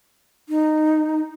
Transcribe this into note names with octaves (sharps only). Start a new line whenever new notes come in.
D#4